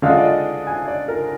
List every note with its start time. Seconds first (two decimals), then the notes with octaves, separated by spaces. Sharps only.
0.02 D3 G#3 D4 F4 F5
0.10 D#5
0.17 D5
0.24 D#5
0.67 G#5
0.88 D5
1.08 A#4